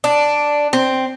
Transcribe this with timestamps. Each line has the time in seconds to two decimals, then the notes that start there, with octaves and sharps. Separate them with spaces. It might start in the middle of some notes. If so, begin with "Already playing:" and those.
0.04 D4
0.73 C4